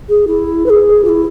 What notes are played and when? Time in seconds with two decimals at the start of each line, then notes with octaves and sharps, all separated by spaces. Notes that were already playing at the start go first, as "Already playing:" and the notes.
0.09 G#4
0.27 E4
0.66 B4
0.70 G#4
1.04 F4
1.09 E4